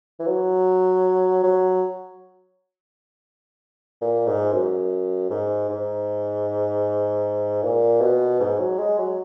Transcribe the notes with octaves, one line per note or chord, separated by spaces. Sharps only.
E3
F#3
F#3
A#2
G#2
F#2
G#2
G#2
A#2
B2
G#2
F#3
G#3
F#3